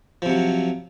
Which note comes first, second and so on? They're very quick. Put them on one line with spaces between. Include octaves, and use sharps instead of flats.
F3 C3 F#3